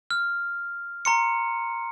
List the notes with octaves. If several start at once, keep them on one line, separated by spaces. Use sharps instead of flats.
F6
A#5 C6 C#7